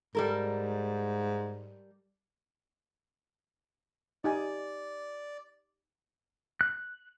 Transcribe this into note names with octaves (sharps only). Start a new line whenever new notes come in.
G#2 G3 A4 A#4
D#4 G4 D5 G#5
F#6